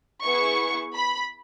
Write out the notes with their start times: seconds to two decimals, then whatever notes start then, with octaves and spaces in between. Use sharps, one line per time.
0.24 B3 E4 G#4 C#6
0.94 B5